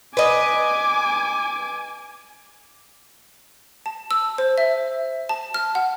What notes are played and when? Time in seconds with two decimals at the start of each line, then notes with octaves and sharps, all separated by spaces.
0.17 B4 D#5 G#5 D6
3.86 A5
4.11 E6
4.38 C5
4.58 E5
5.29 A5
5.54 F6
5.75 F#5